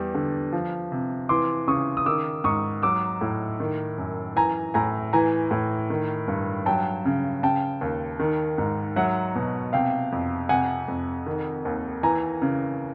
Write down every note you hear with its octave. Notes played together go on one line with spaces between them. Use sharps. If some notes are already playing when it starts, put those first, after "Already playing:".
Already playing: E2 G3
D3
F3
C3
E3 C6 D6
C#3 C#6 D#6
D#6
D#3 D6 E6
G#2 C#6 D#6
F#3 D6 E6
A2
D#3
F#2
E3 G#5 A#5
A2 G#5 A#5
E3 G#5 A#5
A2
D#3
G2
F#3 G5 A5
C#3
C#3 G5 A5
D#2
D#3
G#2
F#3 E5 F#5
B2
C3 F5 G5
F2
C3 F#5 G#5
F2
D#3
D#2
E3 G#5 A#5
C#3